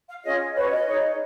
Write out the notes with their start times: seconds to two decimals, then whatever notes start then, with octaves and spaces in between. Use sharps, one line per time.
0.08 F5
0.23 C#4 F4 G#4 C#5 D#5
0.55 C#4 F#4 B4 C#5
0.71 D#5
0.86 D#4 G#4 C#5